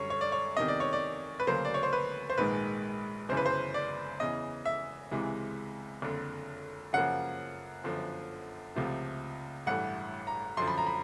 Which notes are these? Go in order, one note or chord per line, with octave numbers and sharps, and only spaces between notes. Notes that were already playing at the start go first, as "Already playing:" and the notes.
Already playing: F#2 D3 G3 C#5
C#5
D5
C#5
E2 C3 D#3 D#5
D5
C#5
D5
B4
D2 C#3 F#3 A#3 C5
D5
C#5
C5
B4
C5
A#1 G#2 D#3 G#3 B4
G1 F#2 C#3 E3 C5
B4
C5
D5
E2 C#3 E3 D#5
E5
C#2 C3 E3 G#3
F#1 F2 D3
F#2 C#3 F3 A#3 F#5
G1 F#2 D3 F3
C#2 C3 F3 A3
A1 G2 E3 A3 F#5
A#5
F#2 D3 F3 C6
B5
A#5
B5